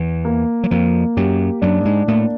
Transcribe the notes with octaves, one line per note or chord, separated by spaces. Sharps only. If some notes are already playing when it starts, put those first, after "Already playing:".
Already playing: E2 E3
A#3
F#3
F2 F3 A#3
F#2 F#3 G4
F#2 F#3 D4
G#2 G#3
A2 A3 A#3